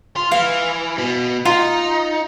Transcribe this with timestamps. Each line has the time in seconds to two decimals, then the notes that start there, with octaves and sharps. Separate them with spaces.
0.16 F4
0.32 E3 F5
0.98 B2
1.45 D#4 F4